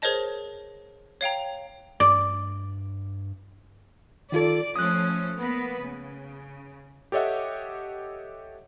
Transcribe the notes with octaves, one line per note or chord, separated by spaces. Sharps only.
G#4 A#4 C5 C#5 D#5 A5
C#5 F5 G5 A#5
G2 D5
D#3 F4 A4 D5
F3 A3 C#4 D#6 F#6
A#3 B3 B4
C#3
G4 A4 C#5 D#5 E5 F#5